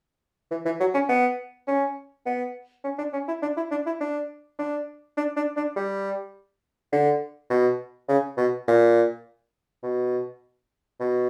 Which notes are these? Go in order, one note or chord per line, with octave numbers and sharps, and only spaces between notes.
E3
E3
F#3
C#4
B3
C#4
B3
C#4
D4
C#4
E4
D4
E4
D4
E4
D4
D4
D4
D4
D4
G3
D3
B2
C#3
B2
A#2
B2
B2